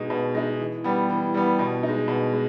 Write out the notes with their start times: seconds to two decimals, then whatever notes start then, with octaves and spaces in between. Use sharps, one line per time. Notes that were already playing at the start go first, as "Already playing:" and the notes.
Already playing: B2 G#3 D#4
0.10 B2
0.35 G#3 D#4
0.59 E3
0.84 G3 B3
1.09 E3
1.34 G3 B3
1.59 B2
1.83 D#4
1.88 G#3
2.08 B2
2.34 G#3